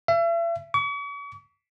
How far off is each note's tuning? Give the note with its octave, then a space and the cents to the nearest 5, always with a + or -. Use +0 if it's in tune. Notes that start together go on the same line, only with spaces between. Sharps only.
E5 +40
C#6 +45